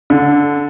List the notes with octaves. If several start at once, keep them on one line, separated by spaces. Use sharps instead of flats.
D3